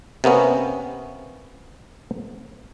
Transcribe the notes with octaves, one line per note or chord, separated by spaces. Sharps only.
C3 A#3 B3 C#4